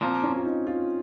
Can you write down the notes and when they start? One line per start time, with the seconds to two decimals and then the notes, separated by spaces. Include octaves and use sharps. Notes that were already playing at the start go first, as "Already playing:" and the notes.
0.01 A#2 F3 A#3 C4
0.23 C#4
0.37 F4
0.45 D#4
0.67 F4